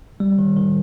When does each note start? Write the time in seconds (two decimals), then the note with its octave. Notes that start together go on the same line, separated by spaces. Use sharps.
0.20 G3
0.39 D#3
0.57 D#3